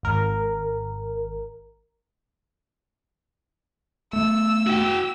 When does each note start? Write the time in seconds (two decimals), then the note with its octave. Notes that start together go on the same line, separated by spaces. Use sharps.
0.03 G#1 A#4
4.13 A3 B3 E6
4.67 F#4 G5